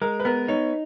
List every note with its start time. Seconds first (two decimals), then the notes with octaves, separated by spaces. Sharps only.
0.02 G#3 A#4
0.20 B4
0.25 B3 A#4
0.48 D#4 C#5